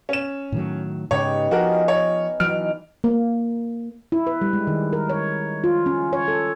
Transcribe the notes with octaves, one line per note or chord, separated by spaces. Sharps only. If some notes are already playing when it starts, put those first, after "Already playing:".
C#4 E7
A2 D#3 F#3
G#2 C#3 B3 D#4 G4 C#5
F3 C#4 F#4 A#4 D#5 F5
C#5
B2 D#3 E3 F#3 F6 D7
A#3
E4
B4
G3
G#3
D#3
A#4
C#5
F4
C#4
C#5
A4